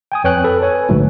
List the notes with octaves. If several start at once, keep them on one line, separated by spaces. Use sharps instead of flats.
G5 G#5 D#6
F2 B4 C#5 G5 G#5 F#6
A4 B4
B4 C#5 G#5
A#1 G#2 D3 F#3 A3